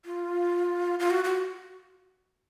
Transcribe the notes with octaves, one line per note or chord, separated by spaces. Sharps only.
F4
F4
F#4
F#4